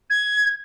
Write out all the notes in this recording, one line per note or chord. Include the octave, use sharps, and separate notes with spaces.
G#6